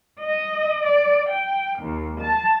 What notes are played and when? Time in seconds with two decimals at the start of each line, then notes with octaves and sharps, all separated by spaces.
0.19 D#5
0.83 D5
1.28 G5
1.79 D#2
2.20 A5